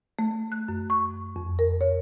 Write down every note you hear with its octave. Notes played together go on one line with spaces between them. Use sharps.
A3
F#6
F#2
C#6
F2
A#4
C#5